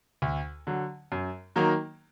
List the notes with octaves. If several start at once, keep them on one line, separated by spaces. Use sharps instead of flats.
D2
D3 F#3
F#2
D#3 F#3 A#3 D#4